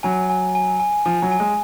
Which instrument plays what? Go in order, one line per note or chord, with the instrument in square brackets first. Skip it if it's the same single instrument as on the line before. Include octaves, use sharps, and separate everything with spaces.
[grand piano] F#3 [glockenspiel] G#5
[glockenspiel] G#5
G#5
G#5
[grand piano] F3 [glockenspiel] G#5
[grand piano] F#3
[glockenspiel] G#5
[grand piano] G#3